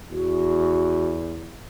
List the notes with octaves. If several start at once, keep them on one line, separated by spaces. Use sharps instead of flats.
E2 F#4